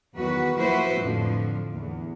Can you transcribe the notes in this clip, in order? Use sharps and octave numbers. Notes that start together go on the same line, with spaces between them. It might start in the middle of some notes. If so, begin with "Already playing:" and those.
E2 D#3 F#3 F#4 B4
F3 A#3 E4 F#4 B4 C5
F2 A2 D3 F3
E2